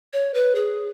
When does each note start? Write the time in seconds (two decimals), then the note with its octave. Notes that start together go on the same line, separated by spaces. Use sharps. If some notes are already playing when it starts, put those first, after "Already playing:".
0.13 C#5
0.34 B4
0.55 G#4